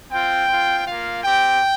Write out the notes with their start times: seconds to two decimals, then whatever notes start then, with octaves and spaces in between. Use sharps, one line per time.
0.11 C4 F4 G5
0.48 C4 F4
0.85 A#3 F4 F5
1.23 C4 G4 G5